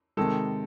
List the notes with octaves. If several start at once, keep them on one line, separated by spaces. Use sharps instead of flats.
C3 D#3 G#3 A4